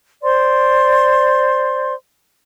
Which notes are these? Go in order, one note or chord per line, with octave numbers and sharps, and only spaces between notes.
C5 D5 C6